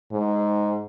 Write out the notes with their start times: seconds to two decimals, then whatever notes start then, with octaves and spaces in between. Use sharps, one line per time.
0.12 G#2